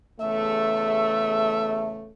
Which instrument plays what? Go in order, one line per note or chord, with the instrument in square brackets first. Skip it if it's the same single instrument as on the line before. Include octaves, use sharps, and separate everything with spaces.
[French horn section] E2 C#3 A3 [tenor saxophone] E5